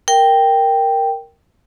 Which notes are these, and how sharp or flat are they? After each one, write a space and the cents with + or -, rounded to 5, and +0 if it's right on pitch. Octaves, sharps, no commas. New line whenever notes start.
A#4 +0 G5 +0